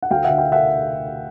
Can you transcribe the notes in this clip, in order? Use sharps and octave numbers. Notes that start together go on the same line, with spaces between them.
F#5
D2 F5 G5
D3 E5 F#5
F5 G5
E5 F#5